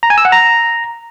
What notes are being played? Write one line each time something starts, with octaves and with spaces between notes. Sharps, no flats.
A#5
G#5
E6
F#5
A#5